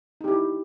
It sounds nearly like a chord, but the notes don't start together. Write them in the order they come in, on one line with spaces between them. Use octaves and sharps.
D#4 G4 E4